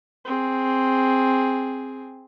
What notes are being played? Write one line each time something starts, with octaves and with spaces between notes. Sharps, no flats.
C4 G#4